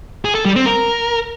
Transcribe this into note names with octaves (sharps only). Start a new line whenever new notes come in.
G#4
A4
G3
C4
A#4